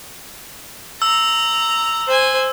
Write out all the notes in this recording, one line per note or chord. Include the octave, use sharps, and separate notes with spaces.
A#5 E6
C5 G#5